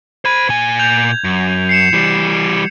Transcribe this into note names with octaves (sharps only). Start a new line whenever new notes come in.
C5 B5 G#6
A#2 G#5
G6 F7
F#2
C7 C#7 E7
E3 G3